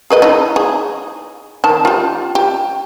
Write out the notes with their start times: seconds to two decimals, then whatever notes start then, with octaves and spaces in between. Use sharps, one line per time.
0.10 G#4 B4 D#5
0.22 D#4 E4
0.56 G#4
1.64 D#3 A5
1.85 F4 G4
2.35 G4